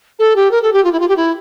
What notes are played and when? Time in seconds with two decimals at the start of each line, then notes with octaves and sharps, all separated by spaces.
0.19 A4
0.36 G4
0.51 A#4
0.63 A4
0.73 G4
0.84 F4
0.92 E4
1.00 F4
1.08 G4
1.17 E4